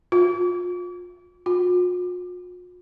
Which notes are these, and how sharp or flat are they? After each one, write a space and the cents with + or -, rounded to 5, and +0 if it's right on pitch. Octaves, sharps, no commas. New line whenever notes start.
F4 +30
F4 +45